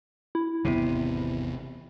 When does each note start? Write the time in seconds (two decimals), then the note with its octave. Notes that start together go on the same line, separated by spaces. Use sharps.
0.35 E4
0.65 G#1 E2 C3 B3